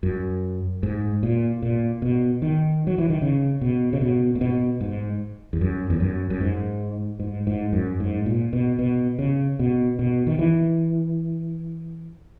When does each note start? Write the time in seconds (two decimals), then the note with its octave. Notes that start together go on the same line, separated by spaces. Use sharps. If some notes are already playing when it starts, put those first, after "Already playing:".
0.03 F#2
0.83 G#2
1.23 A#2
1.62 A#2
2.02 B2
2.42 D#3
2.87 F#3
2.98 E3
3.10 D#3
3.22 C#3
3.61 B2
3.93 C#3
4.01 B2
4.35 A#2
4.41 B2
4.81 G#2
5.53 E2
5.61 F#2
5.90 E2
6.00 F#2
6.30 F#2
6.41 G#2
7.20 G#2
7.47 G#2
7.73 F#2
8.00 G#2
8.26 A#2
8.53 B2
8.79 B2
9.19 C#3
9.59 B2
9.99 B2
10.27 D#3
10.39 E3